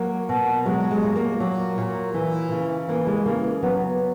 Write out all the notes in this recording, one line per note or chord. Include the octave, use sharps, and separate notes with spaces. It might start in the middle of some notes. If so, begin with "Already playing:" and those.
Already playing: F#3 A#3
B2
F#3 G#3
G#3
A#2
A#3
F#3
A#2
E3
C#3
E3 A#3
G#3
C#3 A#3
F#3 B3